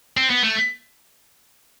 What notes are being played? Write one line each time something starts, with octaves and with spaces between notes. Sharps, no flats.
C4
B3
A3